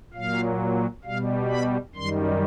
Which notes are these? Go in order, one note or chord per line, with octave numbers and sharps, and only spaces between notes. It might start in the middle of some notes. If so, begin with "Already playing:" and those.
A#2 F#3 F5
B2 G3 F5
B5
F#2 D#3 G3 C6